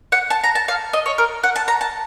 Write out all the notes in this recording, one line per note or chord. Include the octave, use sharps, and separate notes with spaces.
F#5
A5
A#5
A5
F5
D#5
C#5
A#4
F#5
A5
A#5
A5